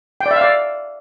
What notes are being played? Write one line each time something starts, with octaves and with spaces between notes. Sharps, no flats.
G5
D5
E5
F5
D5